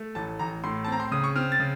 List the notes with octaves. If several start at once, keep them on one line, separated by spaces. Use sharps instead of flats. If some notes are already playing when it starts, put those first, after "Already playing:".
Already playing: A3
A1 A5
A1 A#5
A2 C6
A5
C4 A#5
C6
C#3 D#6
C#6
C4 F6
A6
C#3